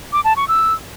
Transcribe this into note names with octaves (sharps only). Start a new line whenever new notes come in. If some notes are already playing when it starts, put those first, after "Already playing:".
D6
A5
C#6
E6